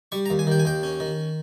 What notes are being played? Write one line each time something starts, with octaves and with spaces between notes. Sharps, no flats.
G3 C#6
A#5
D#2
G#5
D#3 G5
G#5
D#2 G5
C#4
D#3